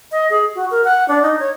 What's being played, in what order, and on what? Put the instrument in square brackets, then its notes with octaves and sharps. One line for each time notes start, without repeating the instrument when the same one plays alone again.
[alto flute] D#5
G#4
F#4
A#4
F#5
D4
D#4
C#5